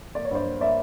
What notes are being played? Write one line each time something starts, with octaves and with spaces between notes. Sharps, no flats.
A#3 D5
C#5
G2 C5 D5
A#3
A#3 D5 E5